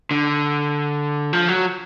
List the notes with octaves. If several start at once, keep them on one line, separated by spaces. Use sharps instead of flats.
D3
F3
F#3